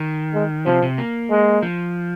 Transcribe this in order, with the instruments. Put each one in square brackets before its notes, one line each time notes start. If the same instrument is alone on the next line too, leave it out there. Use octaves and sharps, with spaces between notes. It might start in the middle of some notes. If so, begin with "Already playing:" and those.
Already playing: [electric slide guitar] D#3
[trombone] G#3
[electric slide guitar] C3 [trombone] F3
[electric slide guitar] C3
A#3
[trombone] G#3
[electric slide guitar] F3